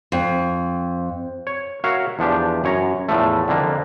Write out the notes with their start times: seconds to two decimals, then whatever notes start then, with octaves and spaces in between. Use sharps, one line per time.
0.12 F2
1.47 C#5
1.84 F#4 A#4 C#5 E5 F5
2.19 E2 F3 D4 G4
2.64 F#2 C#5 A#5
3.09 E2 A2 F3 A3
3.48 F2 D3 A#3